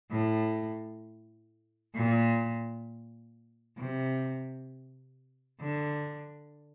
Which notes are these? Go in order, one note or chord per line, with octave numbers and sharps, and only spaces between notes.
A2
A#2
C3
D3